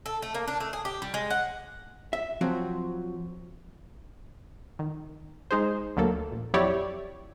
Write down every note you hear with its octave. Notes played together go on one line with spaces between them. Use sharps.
A4
A3
A#3
D4
A3
G#4
G4
G3
G#3
F#5
E5
F3 F#3 C4 F#4
D#3
G#3 D#4 G#4 C5
D2 F#3 A#3 A4
A#1
F2 F#3 E4 G4 C#5 D5